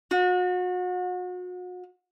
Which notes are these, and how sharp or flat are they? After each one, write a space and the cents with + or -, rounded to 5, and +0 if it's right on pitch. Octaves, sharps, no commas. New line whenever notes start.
F#4 -35